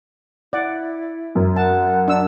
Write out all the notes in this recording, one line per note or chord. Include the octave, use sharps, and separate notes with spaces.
E4 D5 F#5
F#2
F#5 A5
D4 E6